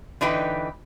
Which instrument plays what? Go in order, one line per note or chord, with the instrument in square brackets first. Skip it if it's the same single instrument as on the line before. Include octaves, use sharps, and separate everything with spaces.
[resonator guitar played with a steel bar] D3 E3 D#4 B4 G5